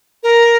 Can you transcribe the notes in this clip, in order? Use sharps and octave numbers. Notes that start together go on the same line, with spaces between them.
A#4